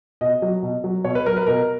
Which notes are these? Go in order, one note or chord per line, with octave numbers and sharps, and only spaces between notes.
B2 D#5
F#3
B2
F#3
B2 C#5
B4
F#3 A#4
B4
B2 A#4